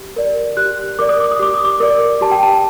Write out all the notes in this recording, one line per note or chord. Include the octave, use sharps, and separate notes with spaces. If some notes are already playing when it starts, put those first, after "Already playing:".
Already playing: G4
A#4 D5
G4 F#6
A#4 D5 D6
D#6
D6
D#6
G4 D6
D#6
D6
A#4 D5
G4 A5
G5
A5